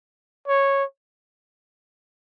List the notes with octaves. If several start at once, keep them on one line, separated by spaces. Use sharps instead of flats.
C#5